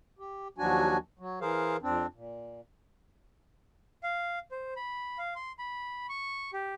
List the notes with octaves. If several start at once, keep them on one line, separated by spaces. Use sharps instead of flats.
G4
D#2 F3 F#3 D4 F#4 G#5
F#3
E3 G#4 A#4 C5 F5
F2 C4 D4
A#2
F5
C5
B5
F5
C6
B5
C#6
G4